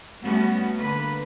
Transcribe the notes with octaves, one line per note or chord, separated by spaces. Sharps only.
G3 A3 B3 C#4 F#4
D3 A#3 B4